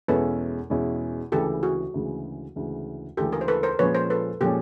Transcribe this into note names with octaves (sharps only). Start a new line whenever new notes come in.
E2 B2 G#3 C#4 E4 A4 B4
E2 B2 G#3 C#4 E4
D2 C#3 E3 G#3 G4 A4
F#4 G#4
D2 C#3 E3 G#3
D2 C#3 E3 G#3
D2 C#3 E3 G#3 G4 A4
G#4 A#4
C5
A4 B4
A#4 C5
A#2 F3 G#3 C#4 B4 C#5
A#4 C5
A4 B4
A#2 F3 G#3 C#4 G4 A4